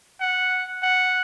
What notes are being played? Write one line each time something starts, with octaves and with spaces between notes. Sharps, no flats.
F#5
F#5